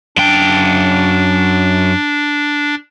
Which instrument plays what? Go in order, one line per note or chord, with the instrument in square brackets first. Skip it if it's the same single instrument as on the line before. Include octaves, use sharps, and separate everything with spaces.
[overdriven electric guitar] F#2 G5 [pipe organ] D4